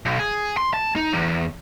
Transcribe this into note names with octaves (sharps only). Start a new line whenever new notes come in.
B1
G#4
C6
A5
D#4
E2